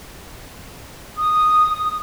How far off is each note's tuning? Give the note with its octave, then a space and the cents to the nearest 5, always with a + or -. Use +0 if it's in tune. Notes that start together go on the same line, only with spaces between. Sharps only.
D#6 -5